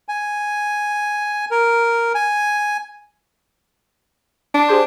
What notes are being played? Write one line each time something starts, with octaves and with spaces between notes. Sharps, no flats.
G#5
A#4
G#5
D4
G4 G#4 C5